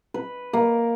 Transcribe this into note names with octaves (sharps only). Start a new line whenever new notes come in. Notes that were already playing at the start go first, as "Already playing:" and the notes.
B4
A#3